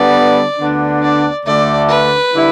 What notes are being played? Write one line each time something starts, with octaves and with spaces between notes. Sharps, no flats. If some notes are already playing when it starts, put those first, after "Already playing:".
Already playing: D3 G3 B3 D5
D2 D3 B3 D4
D5
D2 D3 A3 D5
B4
D3 G3 E4